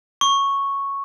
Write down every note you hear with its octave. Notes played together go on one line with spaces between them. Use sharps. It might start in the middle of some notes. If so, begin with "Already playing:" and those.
C#6